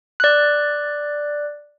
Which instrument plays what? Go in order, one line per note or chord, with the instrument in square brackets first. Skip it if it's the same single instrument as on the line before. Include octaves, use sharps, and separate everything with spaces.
[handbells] D5 F#6